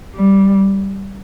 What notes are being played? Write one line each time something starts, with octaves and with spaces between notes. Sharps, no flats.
G3